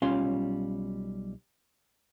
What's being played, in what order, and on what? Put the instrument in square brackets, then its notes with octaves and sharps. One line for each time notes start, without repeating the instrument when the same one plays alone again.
[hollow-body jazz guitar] B1 G3 C#4 F4 F5 C6